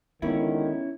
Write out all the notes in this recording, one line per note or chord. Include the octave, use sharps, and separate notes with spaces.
C#2 D3 D#3 B3 C#4 E4